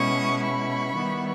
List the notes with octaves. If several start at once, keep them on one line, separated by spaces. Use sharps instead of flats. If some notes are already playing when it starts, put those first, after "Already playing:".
Already playing: B2 G#3 C#4 E4 C#6 D#6
B5 C#6
D#3 G3 B3 E4